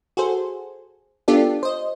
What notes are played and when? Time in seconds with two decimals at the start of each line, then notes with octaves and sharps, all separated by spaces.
0.17 F#4 G#4 A4 C5
1.28 B3 D4 F4 G4 A4 D5
1.63 C5 D#5